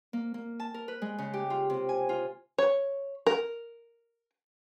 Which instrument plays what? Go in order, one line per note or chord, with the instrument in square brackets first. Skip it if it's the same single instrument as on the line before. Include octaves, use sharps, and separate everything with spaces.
[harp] A#3
A#3
A5
A#4
B4
G#3
C#3
G4
F4
C3
G#5
F4
[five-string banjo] C#5
A#4